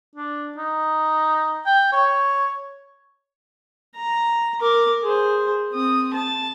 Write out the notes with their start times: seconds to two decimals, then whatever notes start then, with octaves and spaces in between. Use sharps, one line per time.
0.16 D4
0.57 D#4
1.66 G5
1.93 C#5
3.96 A#5
4.61 A#4 D6
5.03 G#4 C5
5.73 C4 D#6
6.14 A5